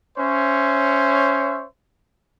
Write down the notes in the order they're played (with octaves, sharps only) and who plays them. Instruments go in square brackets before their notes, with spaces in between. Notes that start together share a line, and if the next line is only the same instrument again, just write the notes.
[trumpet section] C#4 C5 C#5 E5